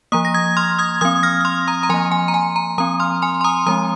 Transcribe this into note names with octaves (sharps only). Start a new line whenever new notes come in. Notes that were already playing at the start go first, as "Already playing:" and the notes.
F3 A#3 A#5 D#6
A#6
D#6 G#6
C6 F6
D#6 G#6
F3 C4 D#6 G#6
F6 A#6
D#6
C6 F6
A#5 D#6
A#5
F3 A#3 G#5 C6
G#5
A#5
G#5
A#5
F3 C4 A#5 D#6
C6 F6
G#5 C6
C6
A#5 D#6
F3 G#3 C4 A#5 D#6